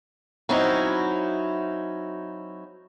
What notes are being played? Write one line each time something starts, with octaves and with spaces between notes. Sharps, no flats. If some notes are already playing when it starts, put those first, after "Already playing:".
F#3 C4 C#4 D#4 E4